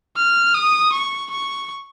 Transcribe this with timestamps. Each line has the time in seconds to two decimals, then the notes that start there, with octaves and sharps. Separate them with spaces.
0.17 F6
0.55 D#6
0.93 C#6
1.31 C#6